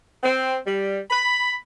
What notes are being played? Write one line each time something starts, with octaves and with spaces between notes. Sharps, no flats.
C4
G3
B5